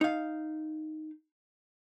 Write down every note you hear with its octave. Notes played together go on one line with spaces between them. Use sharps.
D#4 F5